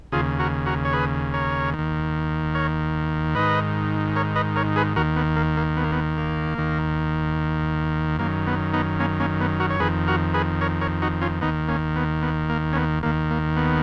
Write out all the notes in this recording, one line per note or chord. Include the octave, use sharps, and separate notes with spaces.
D#2 C#3 F4 G#4
F#4 A#4
F#4 A#4
C#5
G#4 B4
A#4 C#5
D#3
D#2
A#4 C#5
G#2 D#3 B4 D#5
A#4 C#5
B4 D#5
A#4 C#5
G#4 B4
D#2 D#3 F#4 A#4
B3
A#3
A#3
B3
A#3
B3
A#3
D#2 D#3
F#2 D#3 A#3
B3
B3 D#4
A#3 C#4
A#3 C#4
B3
F#4 A#4
C#5
F2 D#3 G#4 B4
F#4 A#4
G#4 B4
A#4 C#5
A#4 C#5
D#4 F#4
C#4 F4
D#2 D#3 B3 D#4
A#3 C#4
B3
B3
A#3
C#4
B3
D#2 D#3 A#3
A#3
B3